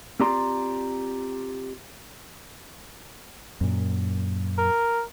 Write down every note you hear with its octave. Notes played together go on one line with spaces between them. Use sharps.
C4 F4 G4 D5 A#5 C6
F#2 A#2
A#4